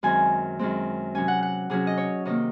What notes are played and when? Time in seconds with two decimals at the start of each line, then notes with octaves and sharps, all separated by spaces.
0.03 F#2 D#3 G#3 C4 G#5
0.59 F#2 D#3 G#3 C4
1.15 C3 F#3 C#4 G#5
1.28 F#5
1.43 F#5
1.70 C3 F#3 C#4 G#4
1.87 D#5
1.98 C#5
2.25 C3 D#3 A#3 D#5